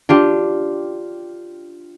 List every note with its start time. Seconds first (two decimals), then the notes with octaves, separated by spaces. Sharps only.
0.09 D4 F4 G4